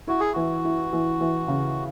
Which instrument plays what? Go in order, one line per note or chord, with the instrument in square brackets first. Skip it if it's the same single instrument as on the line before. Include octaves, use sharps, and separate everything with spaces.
[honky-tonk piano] E4 [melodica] F#4
[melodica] G#4
[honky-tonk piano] E3 [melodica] F#4
[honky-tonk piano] E4
E3
E3
C#3